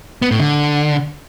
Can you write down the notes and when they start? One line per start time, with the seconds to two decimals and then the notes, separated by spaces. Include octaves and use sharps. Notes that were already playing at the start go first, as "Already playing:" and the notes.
0.22 B3
0.31 A2
0.40 D3